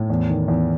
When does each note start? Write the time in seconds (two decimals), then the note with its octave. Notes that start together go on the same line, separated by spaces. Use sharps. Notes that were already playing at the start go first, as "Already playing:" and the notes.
Already playing: A2
0.10 E2
0.30 D#3
0.48 E2